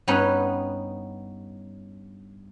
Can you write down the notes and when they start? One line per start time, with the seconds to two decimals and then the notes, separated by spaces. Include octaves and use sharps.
0.07 G2 B3 C#4 D#4 C#5 F#5